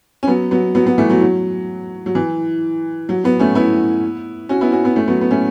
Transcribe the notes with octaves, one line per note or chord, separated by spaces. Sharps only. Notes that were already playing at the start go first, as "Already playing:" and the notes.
C#4
F#3 B3
F#3 B3
F#3 B3
F#3 B3
E3 A3
F#3 B3
F#3
F#3
E3
F#3
F#3 B3
A3 C#4
B3 E4
C#4 F#4
B3 E4
C#4 F#4
B3 E4
A3 C#4
F#3 B3
B3
A3 C#4